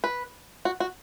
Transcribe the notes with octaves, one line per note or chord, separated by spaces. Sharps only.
B4
F#4
F#4